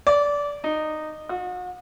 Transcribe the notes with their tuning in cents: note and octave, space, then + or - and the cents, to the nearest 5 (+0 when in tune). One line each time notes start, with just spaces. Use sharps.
D5 -20
D#4 -15
F#4 -40